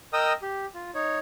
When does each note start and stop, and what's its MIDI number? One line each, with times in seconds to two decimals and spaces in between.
0.13 0.33 70
0.13 0.33 75
0.13 0.33 79
0.13 0.33 87
0.13 0.33 88
0.42 0.66 67
0.75 0.91 65
0.95 1.19 63
0.95 1.19 73